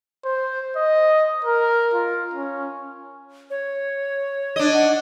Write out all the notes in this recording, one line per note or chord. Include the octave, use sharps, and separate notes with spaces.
C5
D#5
A#4
F4
C#4
C#5
D4 D#5
F#5